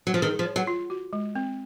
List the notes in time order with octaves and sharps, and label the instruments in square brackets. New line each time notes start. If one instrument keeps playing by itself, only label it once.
[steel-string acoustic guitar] F#3
F3
[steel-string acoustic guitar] D#3 [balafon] G#4
[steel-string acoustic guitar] F3
[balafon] C#5
[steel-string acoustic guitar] F#3
[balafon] F4
F#4
G#3
C4